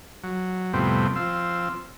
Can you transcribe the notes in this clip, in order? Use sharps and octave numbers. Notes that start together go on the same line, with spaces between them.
F#3
F2 A2 C3 G3 B3 C4
F3 C4 E6